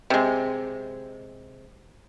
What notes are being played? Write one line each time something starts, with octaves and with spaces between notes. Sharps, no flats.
C3 G#3